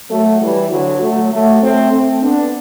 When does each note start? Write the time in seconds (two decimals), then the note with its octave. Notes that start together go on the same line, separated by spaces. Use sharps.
0.10 F#3 A3
0.41 E3 G3
0.70 D3 F#3
1.01 F#3 A3
1.32 F#3 A3
1.62 A3 C4
1.92 A3 C4
2.23 B3 D4